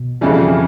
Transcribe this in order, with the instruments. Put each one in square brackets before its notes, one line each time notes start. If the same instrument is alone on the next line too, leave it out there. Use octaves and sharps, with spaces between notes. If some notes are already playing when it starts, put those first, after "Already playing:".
Already playing: [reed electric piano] B2
[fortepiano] F2 C#3 E3 G3